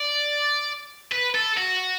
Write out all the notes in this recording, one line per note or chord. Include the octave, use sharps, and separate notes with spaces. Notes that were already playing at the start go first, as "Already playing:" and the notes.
Already playing: D5
B4
A4
F#4